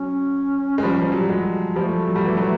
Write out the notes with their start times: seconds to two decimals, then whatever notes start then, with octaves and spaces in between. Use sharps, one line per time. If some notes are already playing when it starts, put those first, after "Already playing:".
Already playing: F#3 C#4
0.78 G#3
0.83 F3 G3
1.02 F3
1.12 F#3
1.20 G3
1.29 F#3 G#3
1.76 F3 G3 A3
2.07 F#3
2.16 G3
2.25 E3 F#3
2.37 E3 F#3